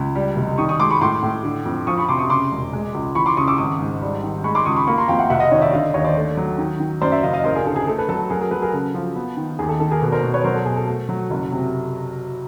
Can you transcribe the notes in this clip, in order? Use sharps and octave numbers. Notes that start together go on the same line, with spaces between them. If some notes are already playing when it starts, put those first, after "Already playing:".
Already playing: C#2
G3
F1
D#3 C#6 D#6
C#6 D#6
G#3 C6 D6
B5 C#6
A2 C6 D6
A2
D3
F2
F3 C#6 D#6
B5 C#6
C3 C6 D6
C#6 D#6
C#3 C6 D6
E1
G#3
C#2
E3 B5 C#6
C6 D6
C#3 C#6 D#6
D6 E6
G#1 C#6 D#6
G#2
G3
D#3
G#3 B5 C#6
C6 D6
C#2 C#6 D#6
B5 C#6
A#3 B5 C#6
A#5 C6
F2 F5 G5
E5 F#5
F1 E5 F#5
D#5 F5
D#3 C#5 D#5
D5 E5
D3 D#5 F5
D#2 C#5 D#5
C5 D5
A3
F#3
D#3
D#3
F#2 C5 D5
D5 E5
F#1 D#5 F5
D#5 F5
A1 A#4 C5
G#4 A#4
D3 A4
G#4
A3 A4
A4 B4
F#3 A4
F#3 G#4 A#4
G#4 A#4
F#3 A4 B4
G#4 A#4
C#3 A4
F3
B3
D#3
D#2 G#4
A4
D#3 A4
G#4 A#4
B2 A4 B4
A#4 C5
B2
B4 C#5
F#3 A#4 C5
A4
B2 G#4
A4
A3
F#3
F#1
C3